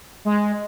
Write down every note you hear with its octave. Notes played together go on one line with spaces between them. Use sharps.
G#3